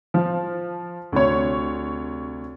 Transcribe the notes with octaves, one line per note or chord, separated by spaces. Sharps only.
F3
D2 C3 C#5